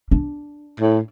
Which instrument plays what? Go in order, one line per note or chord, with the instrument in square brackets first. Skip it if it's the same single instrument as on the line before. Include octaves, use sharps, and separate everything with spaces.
[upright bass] D4
[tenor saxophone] A2